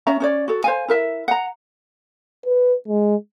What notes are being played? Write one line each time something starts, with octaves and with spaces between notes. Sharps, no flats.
C#4 C#5 E5 A#5
C#4 C#5 D5
F#4 A4
C5 F5 G#5
E4 A#4 E5
F#5 A#5
B4
G#3